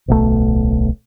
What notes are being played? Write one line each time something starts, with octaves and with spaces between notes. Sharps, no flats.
D1 B1 A3